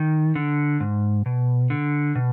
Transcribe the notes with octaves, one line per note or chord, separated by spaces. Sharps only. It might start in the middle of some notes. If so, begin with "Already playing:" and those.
Already playing: D#3
D3
G#2
B2
D3
B2